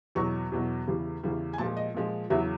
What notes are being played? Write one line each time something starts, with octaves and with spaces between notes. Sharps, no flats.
E2 B2 F#3 C#6
E2 B2 F#3
E2 C#3 E3 G3
E2 C#3 E3 G3
G#5
A#2 F3 G#3 A5
D#5
A#2 F3 G#3
E2 C#3 F#3 E5